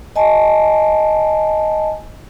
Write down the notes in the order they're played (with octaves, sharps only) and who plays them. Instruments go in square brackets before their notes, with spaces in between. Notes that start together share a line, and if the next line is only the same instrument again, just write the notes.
[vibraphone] D#5 G#5 A5